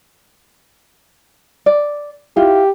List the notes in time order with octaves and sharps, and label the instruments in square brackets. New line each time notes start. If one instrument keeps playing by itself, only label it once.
[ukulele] D5
[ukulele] E4 F4 [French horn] G4